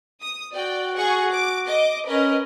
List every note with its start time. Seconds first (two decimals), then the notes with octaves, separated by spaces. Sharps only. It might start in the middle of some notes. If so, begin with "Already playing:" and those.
0.21 D#6
0.54 F#4 D5 G5
0.97 G#4 F#5 C#6
1.32 D6
1.67 D#5 D6
2.07 C#4 A#4 B4 D#5